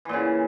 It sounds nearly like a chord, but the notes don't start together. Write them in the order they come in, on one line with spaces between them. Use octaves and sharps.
E3 A#2 C#3